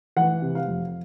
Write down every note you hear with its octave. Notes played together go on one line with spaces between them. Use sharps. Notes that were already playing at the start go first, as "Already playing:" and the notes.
E3 F#5
C3
F5
F2